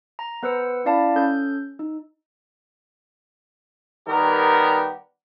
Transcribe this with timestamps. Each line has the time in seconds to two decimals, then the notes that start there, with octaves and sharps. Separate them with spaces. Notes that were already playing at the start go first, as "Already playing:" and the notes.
0.19 A#5
0.43 B3 B4 C5 E6 C#7
0.85 C#4 E4 D5 F5 A5 B5
1.16 C#4 A4 G6
1.79 D#4
4.07 D#3 G3 B3 G4 A#4